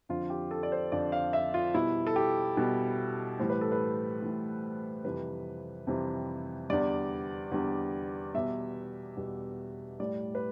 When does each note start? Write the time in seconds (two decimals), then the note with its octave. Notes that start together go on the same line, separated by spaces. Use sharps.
0.09 F2 D3 F3 F4
0.30 G4
0.51 A4
0.63 D5
0.72 C5
0.92 F2 D3 F3 D5
1.12 F5
1.33 E5
1.54 F4
1.74 B2 G3 E4
2.07 A4
2.16 G4
2.57 B2 G3
3.39 A2 E3 G3 C5
3.50 B4
3.61 A4
3.72 B4
4.22 A2 E3 G3
5.05 F2 C3 E3 G3 B4
5.87 F2 C3 E3 G3
6.70 E2 D3 G3 D5
7.52 E2 D3 G3
8.34 E2 B2 G3 E5
9.17 E2 B2 G3
10.00 A2 G3 D5
10.35 B4